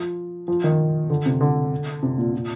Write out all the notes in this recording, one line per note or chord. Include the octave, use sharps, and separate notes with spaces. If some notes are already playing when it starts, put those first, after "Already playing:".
Already playing: F3
F3
D#3
D3
C3
D3
C3
A#2
A#2